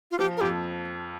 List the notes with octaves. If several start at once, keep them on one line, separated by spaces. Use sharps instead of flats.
F4
F3 G4
A#4
F2 G4